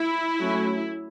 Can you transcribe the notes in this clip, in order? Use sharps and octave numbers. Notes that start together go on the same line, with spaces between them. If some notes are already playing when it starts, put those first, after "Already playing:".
Already playing: E4
F#3 A3 C#4